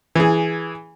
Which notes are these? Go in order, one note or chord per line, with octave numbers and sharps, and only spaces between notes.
E3 G#4